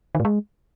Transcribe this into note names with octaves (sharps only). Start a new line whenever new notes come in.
D#3
A2
G#3